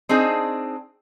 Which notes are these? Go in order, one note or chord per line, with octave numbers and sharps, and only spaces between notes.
C4 D4 D#4 G#4